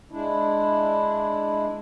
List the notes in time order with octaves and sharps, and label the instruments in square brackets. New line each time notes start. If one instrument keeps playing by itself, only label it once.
[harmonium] G#3 D4 E4